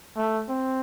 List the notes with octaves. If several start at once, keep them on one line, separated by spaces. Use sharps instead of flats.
A3
C4